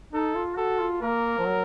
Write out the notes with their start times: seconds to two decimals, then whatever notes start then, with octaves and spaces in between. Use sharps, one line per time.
0.13 D#4 A4
0.35 F4
0.57 F#4 A4
0.79 F4
1.01 A#3 A#4
1.38 F3
1.45 F#3